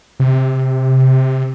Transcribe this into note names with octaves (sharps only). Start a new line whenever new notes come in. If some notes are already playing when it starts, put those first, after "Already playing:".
C3